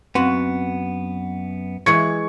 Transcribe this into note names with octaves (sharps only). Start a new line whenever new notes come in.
F#2 B3 C4 F#4
E3 G#3 E4 C#6 G#6 C#7